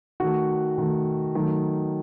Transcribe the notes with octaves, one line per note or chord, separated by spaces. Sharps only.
D#3 A3 F#4
D#3 A3
D#3 F#3 A3